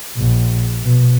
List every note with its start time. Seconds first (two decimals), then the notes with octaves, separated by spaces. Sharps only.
0.17 A#1
0.83 B2